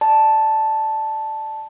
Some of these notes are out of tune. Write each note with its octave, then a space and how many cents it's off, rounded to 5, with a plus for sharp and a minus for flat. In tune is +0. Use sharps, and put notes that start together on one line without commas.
D5 +35 A5 -5